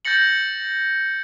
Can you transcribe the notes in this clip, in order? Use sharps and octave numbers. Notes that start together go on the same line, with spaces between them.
G6 A6 A#6 C#7 F#7